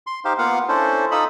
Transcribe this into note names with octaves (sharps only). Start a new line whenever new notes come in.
C6
D#4 G4 C5 F5
A#3 B3 F4 F5 F#5
C#4 D4 E4 A4 C5
D#4 F4 A4 D#5 B5 E6